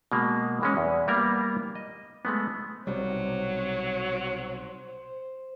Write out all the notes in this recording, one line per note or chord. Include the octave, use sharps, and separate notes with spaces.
B2 G#3 A#3
E3 G#3 C#4
E2
G3 A#3 B3 A#4 F5
D#5
G#3 A3 B3
B1 C3 F#3 G3 C5